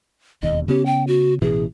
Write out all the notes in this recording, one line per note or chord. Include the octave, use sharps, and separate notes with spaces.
E1 D#2 D#5
C#3 B3 C#4 G4
G5
F#4
A1 B2 E3 G#4